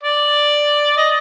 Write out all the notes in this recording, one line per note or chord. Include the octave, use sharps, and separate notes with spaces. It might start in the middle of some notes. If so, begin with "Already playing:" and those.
D5
D#5